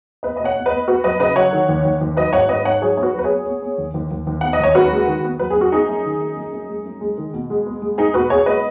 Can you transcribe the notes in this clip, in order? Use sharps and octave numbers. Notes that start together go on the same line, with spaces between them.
B3 B4 D#5
B2 D#5
C#5 F#5
B3
B4 D#5
B3
B3 F#4 B4
F#3 B4 D#5
C#3 B4 D#5
F#3 C#5 F#5
D#3
D#2
D#2
D#2
F#3 B4 D#5
G#2 C#5 F#5
G#2 B4 D#5
G#2 C#5 F#5
F#3 G#4 C#5
B3 C#5
F#4 B4
F#3 B4
G#4 C#5
B3
B3
B3
D#2
D#2
D#2
D#2
B3 F#5
D#5
D#2 C#5
F#2 F#4 B4
G#3
D#3
B3
F#3 B4
G#4
F#2 F#4
B3 D#4 G#4
F#2
D#3
F#2
F#2
F#2
G#3
F#2
G#3
D#3
B2
G#3
B3
G#3
G#3 D#4 G#4
B2 F#4 B4
B3 G#4 C#5
G#3 B4 D#5